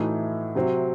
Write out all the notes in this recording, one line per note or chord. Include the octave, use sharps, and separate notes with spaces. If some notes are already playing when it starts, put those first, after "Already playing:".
Already playing: A2 E3 A3 D#4 F#4
C3 F#3 C4 F#4